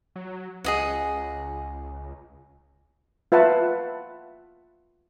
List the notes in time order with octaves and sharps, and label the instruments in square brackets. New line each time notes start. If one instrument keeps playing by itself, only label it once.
[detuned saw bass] F#3
[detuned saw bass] C#2 [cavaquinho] G#4 D#5 F#5
[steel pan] F4 B4 E5 F#5 A5